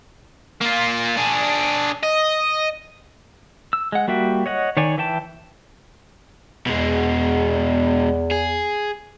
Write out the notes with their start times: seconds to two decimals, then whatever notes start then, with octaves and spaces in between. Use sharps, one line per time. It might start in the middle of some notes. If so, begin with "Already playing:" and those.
0.61 A#3 F4
1.17 D4 G#4
2.03 D#5
3.73 E6
3.92 G#3 F#5
4.08 G3 A#3 F#4 E5 G5
4.46 C#5 D#5 F#5
4.77 D#3 C#5 D5 G#5
4.98 E3 E5 G5 A5
6.67 E2 B2 G#3
8.31 G#4